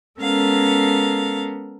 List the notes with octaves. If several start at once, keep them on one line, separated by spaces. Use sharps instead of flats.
G#3 B3 C#4 A4 A#4 F5